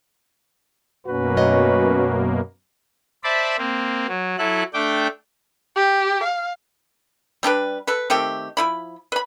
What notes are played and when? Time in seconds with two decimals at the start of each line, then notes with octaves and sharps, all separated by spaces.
1.06 F#2 B2 A#3 C#4 F#4 B4
1.37 A3 C#5 D#5
3.24 C5 D5 E5 A5 B5
3.58 A#3 C4
4.08 F#3
4.38 F#3 E4 A4 F#6
4.74 A3 D4 G5 D6
5.76 G4
6.23 F5
7.43 G3 D4 G4 B4
7.87 A4 B4
8.10 D#3 A3 C4 G4
8.57 F3 E4 B5
9.12 B4 B5